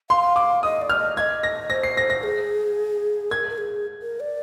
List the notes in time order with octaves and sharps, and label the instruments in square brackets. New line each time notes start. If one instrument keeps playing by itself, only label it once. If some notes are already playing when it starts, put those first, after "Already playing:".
[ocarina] F5 [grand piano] C6
[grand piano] D6
[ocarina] D#5 [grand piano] D#6
[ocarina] D5
[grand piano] F6
[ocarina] D#5
[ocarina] D#5 F5 [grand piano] G#6
[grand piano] A#6
[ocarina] C5 [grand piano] A#6
[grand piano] C7
A#6
A#6
[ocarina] G#4
[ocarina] A#4 [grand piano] G#6
[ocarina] A#4
G#4
A#4
D5